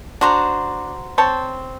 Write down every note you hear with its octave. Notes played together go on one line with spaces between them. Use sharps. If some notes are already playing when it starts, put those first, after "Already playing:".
D4 F#4 C5 A#5
C4 C#5 A5